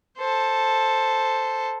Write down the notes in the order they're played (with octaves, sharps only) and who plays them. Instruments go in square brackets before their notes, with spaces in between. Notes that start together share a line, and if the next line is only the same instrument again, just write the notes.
[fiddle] A4 C5